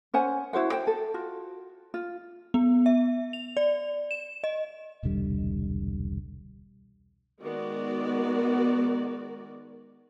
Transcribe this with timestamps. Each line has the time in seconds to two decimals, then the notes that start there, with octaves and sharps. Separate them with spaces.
0.14 C#4 C5 F#5 G#5
0.53 E4 F#4 C5 F#5
0.72 C5 G5
0.87 A4
1.14 F4 F#4
1.94 F4
2.54 B3
2.86 E5
3.33 F7
3.57 D5
4.11 E7
4.44 D#5
5.03 E1 C2 D3 G3
7.42 D#3 G#3 B3 F#4 A#4 D5